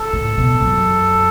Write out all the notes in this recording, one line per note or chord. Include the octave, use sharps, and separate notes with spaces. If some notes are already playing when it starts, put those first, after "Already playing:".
Already playing: A4
A2
B2
F#2